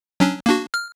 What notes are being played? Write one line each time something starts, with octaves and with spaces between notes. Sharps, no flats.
F#3 C#4 D4
A#3 D4 F#4
F6